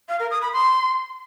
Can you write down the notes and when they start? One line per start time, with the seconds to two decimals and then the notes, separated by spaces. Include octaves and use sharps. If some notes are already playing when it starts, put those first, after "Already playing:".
0.09 F5
0.20 A#4
0.31 D#6
0.42 B5
0.53 C6